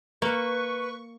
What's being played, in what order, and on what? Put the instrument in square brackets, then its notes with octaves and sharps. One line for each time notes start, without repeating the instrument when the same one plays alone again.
[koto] A#3 [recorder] B4 [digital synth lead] C#6